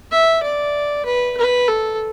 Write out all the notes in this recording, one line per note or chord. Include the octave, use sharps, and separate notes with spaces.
E5
D5
B4
B4
A4